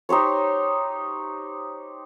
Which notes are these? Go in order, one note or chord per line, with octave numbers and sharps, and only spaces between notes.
D#4 G4 C5 C#5